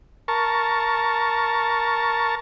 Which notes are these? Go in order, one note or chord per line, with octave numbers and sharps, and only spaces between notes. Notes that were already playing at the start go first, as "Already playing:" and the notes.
A#4 A5 C#6